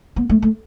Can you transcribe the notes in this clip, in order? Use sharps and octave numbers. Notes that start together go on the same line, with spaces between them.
B3
A3
A3